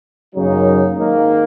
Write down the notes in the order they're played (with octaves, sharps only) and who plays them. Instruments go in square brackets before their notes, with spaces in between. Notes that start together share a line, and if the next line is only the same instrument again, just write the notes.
[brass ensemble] F#2 C#3 F#3 A#3 D#4
G#2 D#3 A#3